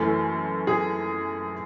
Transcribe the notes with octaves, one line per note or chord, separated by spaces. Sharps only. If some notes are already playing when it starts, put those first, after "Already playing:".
Already playing: F#2 E3 A3
G#4